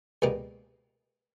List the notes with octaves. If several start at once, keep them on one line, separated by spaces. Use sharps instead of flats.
C#2 B2 G3 A#3